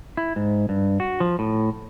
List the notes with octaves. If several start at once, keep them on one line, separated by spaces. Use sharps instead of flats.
E4
G#2
G2
F#4
F3
A2